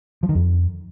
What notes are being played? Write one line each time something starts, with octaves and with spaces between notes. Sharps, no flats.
F3
D#3
F2